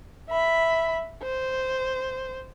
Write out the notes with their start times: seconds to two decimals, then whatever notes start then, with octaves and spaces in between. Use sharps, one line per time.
0.29 E5 B5
1.23 C5